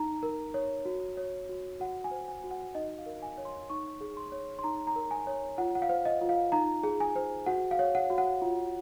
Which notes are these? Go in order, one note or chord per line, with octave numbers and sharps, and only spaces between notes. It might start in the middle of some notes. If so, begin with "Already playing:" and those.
Already playing: D#4 A#5
A#4
C#5
F#4
C#5
F#4
F#4 F#5
G#5
C5
G#5
F#4
F#5
D#4 D#5
F5
A#4
G#5
C#5
C6
D#4 C#6
G#4
C6
C#5
C6
D#4 A#5
A#5
A#4
G#5
C#5
F4 F#5
F#5
F5
C5
D#5
F4
F5
D#4 A#5
G#4
G#5
C5
F#4 F#5
F5
C#5
F#5
F#4
F#5
F4